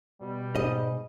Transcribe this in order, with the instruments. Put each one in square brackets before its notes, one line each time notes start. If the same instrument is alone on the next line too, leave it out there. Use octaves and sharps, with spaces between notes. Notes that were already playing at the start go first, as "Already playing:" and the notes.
[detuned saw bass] B2 [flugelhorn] G3
[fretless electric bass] G#2 [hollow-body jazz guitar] D#5